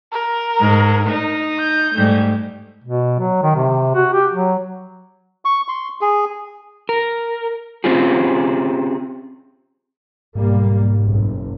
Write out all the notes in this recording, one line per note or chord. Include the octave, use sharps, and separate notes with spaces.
A#4
G#2
D#4
G6
G#2 G3 A3
B2
F#3
D#3
C3
F#4
G4
F#3
C#6
C6
G#4
A#4
C4 C#4 F4 G4 G#4
B1 G#2 G3 A#3
F#1 B1 E2